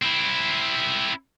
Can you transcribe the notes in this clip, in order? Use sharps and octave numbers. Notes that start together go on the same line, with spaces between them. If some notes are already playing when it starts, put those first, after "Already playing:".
C4 E4